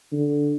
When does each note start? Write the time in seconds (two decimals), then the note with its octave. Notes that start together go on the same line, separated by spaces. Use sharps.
0.12 D3